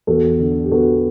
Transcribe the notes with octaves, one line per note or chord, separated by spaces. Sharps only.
E2 F#4 A4
D3
G4
B3 F#4 A4